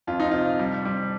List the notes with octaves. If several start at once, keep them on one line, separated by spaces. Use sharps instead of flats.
F2 F4
D#4
C3 F4
G3
G3